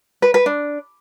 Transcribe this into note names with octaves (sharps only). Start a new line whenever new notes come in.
B4
B4
D4